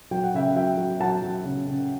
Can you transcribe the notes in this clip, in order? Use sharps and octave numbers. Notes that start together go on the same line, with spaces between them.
F#3 G5
F#5
C#3 E5 G5
F#3 E5 G5
F#3
F#3 F#5 A5
F#3
C#3
C#3